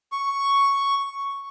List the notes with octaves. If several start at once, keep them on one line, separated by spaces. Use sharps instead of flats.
C#6